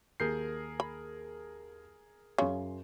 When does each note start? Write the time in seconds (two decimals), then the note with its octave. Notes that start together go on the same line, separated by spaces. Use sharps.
0.20 D#2 G#4 A#4 G6 C7
0.80 B5
2.38 F#2 C#3 C6